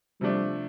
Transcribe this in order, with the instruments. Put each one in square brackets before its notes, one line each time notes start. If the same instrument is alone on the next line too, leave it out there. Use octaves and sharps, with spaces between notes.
[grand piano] C3 F3 A3 D4 [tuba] G3